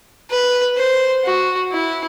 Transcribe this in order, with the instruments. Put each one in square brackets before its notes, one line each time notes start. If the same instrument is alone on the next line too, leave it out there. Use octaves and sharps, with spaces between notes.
[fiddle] B4
C5
F#4
E4